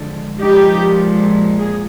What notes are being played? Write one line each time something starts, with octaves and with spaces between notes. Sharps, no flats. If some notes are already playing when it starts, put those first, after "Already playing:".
Already playing: D3 F3 G#3
A#2 F3 G#3 D#4 G4
G#4